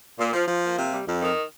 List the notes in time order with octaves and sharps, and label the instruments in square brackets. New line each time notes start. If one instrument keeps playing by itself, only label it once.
[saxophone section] A#2
F3
F3
A#3
C3
G3
F2
D#3